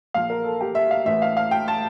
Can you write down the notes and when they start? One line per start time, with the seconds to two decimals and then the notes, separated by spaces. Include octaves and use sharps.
0.14 A#1 A#2 F3 F5
0.30 A#4
0.44 A4
0.61 G4
0.75 E5
0.91 F5
1.06 A1 A2 E3 E5
1.22 F5
1.37 F5
1.51 G5
1.68 A5